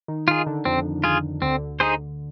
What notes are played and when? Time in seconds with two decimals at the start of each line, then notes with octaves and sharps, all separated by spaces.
0.08 D#3 D#4
0.28 D#3 D#4 F4
0.31 G#4
0.46 D3 D4
0.65 F2 F3 C4
1.04 F4 G#4
1.42 D2 D3 C4
1.80 D#4 G#4 C5